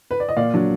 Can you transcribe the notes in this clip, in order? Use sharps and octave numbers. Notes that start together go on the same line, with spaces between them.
B4
D5
D#5
A#2 D5 F5
F#3 D4